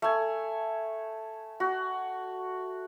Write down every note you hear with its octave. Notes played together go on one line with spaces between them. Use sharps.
A3 G#5
F#4